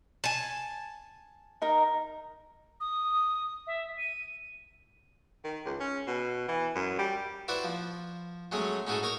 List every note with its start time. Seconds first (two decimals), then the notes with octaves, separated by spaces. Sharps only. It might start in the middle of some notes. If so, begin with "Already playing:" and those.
0.24 G#5 A5
1.62 D#4 A#4
2.80 D#6
3.67 E5
3.98 D#7
5.44 D#3
5.66 C#2
5.80 C#4
6.07 B2
6.48 E3
6.76 F#2
6.99 G3
7.48 E4 F#4 B4 C5 D5 E5
7.64 F3
8.52 F#3 G#3 A3 C#4 G#4
8.87 C#4 D#4 E4 F#4 G#4 A4
9.03 D#4 A#4 C#5 C#6 D#6